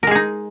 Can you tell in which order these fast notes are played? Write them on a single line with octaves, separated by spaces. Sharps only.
A#4 G#3 G#4 D#4